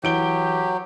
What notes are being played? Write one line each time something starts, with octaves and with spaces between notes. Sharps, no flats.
E3 F#3 G4 D7 G7